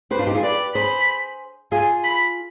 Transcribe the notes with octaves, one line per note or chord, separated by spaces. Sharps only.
G4 B4 C5
D4 F4
D#4 G4
F4 G#4
G4 B4 D5
G#4 C5 B5
F4 G#4 G#5
B5